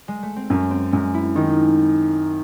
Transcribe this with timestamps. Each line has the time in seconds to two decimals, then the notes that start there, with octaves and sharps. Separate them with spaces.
0.08 G#3
0.23 A3
0.36 C4
0.50 F#2 C#4
0.71 C4
0.92 F#2 G#3
1.14 E4
1.36 D#3 D#4